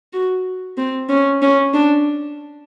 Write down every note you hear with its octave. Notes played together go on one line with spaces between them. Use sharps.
F#4
C4
C#4
C#4
D4